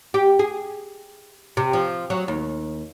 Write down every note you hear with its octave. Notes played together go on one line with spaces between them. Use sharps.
G4
G#4
C3
F3
F#3
D#2